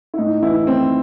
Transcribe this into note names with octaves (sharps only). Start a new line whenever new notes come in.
E4
A2 D#4
E3 E4
A2 C4